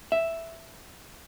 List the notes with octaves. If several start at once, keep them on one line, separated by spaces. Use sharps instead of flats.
E5